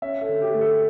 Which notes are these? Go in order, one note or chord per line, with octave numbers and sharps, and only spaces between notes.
C#4 E5
A4
D3
G4
A3
A4